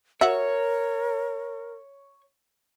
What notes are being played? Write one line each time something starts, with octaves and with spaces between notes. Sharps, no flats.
F#4 A#4 C#5 E5